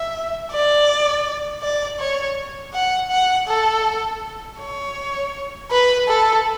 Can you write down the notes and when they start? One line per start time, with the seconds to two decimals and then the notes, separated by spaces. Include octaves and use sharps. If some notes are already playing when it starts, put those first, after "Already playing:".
Already playing: E5
0.51 D5
1.62 D5
1.99 C#5
2.73 F#5
3.10 F#5
3.48 A4
4.59 C#5
5.71 B4
6.08 A4